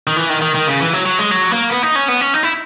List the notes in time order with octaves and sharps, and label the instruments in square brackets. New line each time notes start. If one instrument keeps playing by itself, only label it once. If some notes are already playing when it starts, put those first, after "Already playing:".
[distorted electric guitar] D#3
E3
D#3
D#3
D#3
C#3
E3
F#3
F#3
G#3
F#3
A#3
B3
D#4
C#4
B3
C#4
D#4
E4